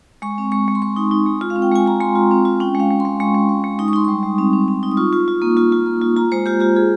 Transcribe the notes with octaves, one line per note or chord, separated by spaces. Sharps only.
G#3 C#6
C4
G#3 C#6
G#3
C6
G#3 C#6
D#4
D#4
G#3
F4
F5
C4
G5
G#3 G#5
G#3 A#5
G#3 C6
F4
C4
F4
C#4 G5
G#3
F5
G#3
C6
G#3
G#3 C#6
G#3
G#3
G#3
D#4 D#6
C#6
D#4 C6
G3 C#6
G3
C4
C4
C4
D#4
D#6
F4 C#6
F4
F4
A#3
F4
F4
A#3
F4
F4 A#5
G#3 C5
F4 G4
F4 G4
F4 G#4